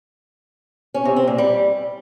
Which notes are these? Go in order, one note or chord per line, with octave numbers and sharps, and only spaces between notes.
C#4
C3
C4
A#2
G3